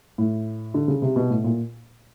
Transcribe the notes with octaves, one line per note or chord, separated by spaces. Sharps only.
A2
D3
C#3
C3
B2
A2
A#2